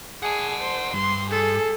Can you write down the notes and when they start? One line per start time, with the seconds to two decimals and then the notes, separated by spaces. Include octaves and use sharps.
0.23 G#4 F#5 A5
0.60 C5
0.94 G2 C6
1.31 G#4 A4